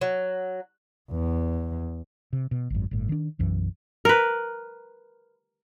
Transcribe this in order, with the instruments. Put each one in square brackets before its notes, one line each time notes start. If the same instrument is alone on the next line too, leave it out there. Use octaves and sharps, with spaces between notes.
[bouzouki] F#3
[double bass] E2
[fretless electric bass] C3
B2
G#1 F#2
G1 A2
D#3 D4
B1 F#2 E3
[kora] A#4 B4